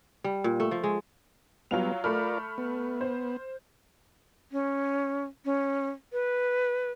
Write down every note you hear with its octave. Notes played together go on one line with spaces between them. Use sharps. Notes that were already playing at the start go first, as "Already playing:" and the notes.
G3
A#2
A3
F3
G#3
F#3 G3 B3 F4 F7
A3 F4 A#4 D5 B5 F6
B3
C5
C#4
C#4
B4